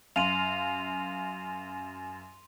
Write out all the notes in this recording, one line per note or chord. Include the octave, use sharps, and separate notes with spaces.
F#2 F5 C6 D#7 F7